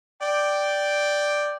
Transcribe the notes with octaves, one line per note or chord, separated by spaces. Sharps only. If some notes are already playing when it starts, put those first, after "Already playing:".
D5 G5